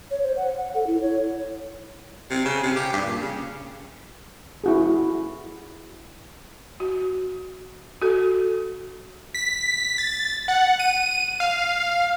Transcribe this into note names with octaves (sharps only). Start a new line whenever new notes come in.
C#5
C5
F#5
F#5
A4
E4
C#5
C3
C#3
C3
G4
G2
A#2
C#3
E4 F#4 G#4
F#4
F#4 A4
B6
A6
F#5
D#7
F5